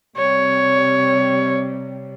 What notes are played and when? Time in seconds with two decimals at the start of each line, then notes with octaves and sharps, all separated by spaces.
0.17 C3 G3 C#5